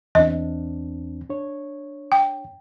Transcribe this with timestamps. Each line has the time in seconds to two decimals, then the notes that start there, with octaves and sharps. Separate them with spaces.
0.15 E2 C4 D4 D#5
1.30 D4 C#5
2.12 G5